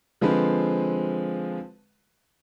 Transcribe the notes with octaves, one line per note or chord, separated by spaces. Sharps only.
D3 F3 G#3 C4 B4